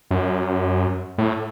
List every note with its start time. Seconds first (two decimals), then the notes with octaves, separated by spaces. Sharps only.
0.11 F#2
1.18 A2